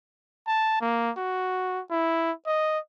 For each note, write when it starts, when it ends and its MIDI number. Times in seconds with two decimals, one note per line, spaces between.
0.47 0.80 81
0.81 1.11 58
1.17 1.81 66
1.91 2.32 64
2.46 2.79 75